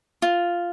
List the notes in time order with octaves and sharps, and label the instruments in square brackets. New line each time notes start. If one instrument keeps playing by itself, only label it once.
[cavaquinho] F4